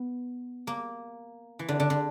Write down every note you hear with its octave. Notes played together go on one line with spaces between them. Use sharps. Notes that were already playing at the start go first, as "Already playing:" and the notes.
Already playing: B3
A#3
E3
D3
D3
D3